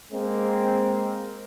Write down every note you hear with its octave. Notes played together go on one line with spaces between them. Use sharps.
G#3 A#3 C4